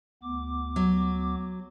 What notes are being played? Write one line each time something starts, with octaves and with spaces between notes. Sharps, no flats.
D2 B3 D6
F#3